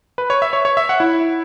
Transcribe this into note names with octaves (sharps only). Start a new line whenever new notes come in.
B4
C#5
E5
C#5
C#5
E5
F#5
E4